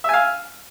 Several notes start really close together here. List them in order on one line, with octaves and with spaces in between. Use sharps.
E5 G#5 F5